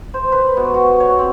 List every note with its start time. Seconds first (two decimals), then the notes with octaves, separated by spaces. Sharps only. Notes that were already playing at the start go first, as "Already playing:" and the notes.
0.14 C5
0.32 B4
0.57 B2
0.74 F#4
1.00 C#5
1.19 C4